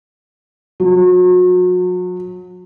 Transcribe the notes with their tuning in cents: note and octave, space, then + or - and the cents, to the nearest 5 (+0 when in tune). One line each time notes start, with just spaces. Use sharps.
F#3 -35